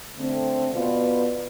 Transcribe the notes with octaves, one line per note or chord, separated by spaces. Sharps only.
D3 A3 C4
B2 B3 F4 B4 D5